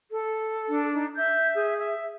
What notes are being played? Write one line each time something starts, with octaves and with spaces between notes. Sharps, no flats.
A4
D4
D#4
E5 G6
G#4
E5